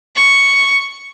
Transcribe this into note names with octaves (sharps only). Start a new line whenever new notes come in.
C#6